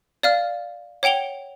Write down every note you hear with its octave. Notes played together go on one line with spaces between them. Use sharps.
D5 F5 F6
C#5 F#5 G5 F7 G7